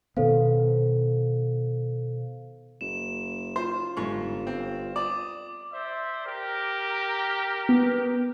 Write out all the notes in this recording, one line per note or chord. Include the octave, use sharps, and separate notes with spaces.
B2 D#3 B3 A4 C5 F5
F#1 E7
F4 C5
G1 G#2 C#6
C4
D5 D6 D#6
C5 D5 E5
G4 A#4
B3